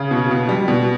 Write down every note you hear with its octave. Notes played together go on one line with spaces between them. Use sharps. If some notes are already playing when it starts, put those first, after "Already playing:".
Already playing: C#3
B2
B2
G3
B2